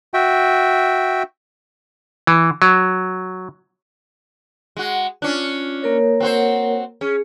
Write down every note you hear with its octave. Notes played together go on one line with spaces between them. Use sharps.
F#4 E5 G5
E3
F#3
G#3 F#4
C#4 D4 F4
A#3 A#4 C#5
C4 F#4 C5
C#4 G#4